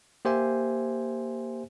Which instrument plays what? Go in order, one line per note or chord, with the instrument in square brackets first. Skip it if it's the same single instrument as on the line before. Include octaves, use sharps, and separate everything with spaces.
[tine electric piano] A#3 G4 C5 E5 G#5